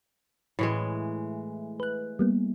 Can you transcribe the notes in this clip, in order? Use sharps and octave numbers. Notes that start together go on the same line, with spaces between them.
A2 E3 G#3
B4 F#6
G3 A#3 B3